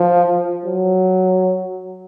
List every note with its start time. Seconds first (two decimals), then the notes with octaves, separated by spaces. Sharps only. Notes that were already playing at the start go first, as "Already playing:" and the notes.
Already playing: F3
0.66 F#3